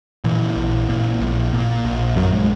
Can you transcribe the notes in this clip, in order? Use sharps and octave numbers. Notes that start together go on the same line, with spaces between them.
A#2 E3
A#1
A#2
A#1
A#2
A#1
A#1 F#2 F#3
G#3